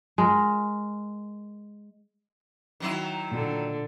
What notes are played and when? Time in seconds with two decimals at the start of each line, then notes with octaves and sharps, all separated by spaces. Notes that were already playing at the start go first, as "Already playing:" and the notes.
0.18 G#3 A#4
2.80 D#3 F#3 E4
3.32 A#2 D3